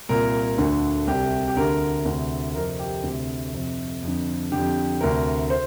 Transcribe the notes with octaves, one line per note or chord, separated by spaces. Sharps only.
C2 A#2 A#4
D2 D3
C2 C3 G4
G4
D2 D3 A#4
D2
C3
F2 C3 A#4
G4
D2 C3
F2 C3
F2 D3
F2 D3 G4
D2 C3 A#4
C5